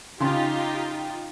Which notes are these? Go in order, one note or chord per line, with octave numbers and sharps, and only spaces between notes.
C#3 D#4 F4 G4 C6